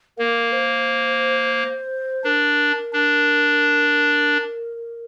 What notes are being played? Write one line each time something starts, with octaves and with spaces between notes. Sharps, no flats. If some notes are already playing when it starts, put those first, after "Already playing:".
A#3 A#4
C5
D4 A#4
D4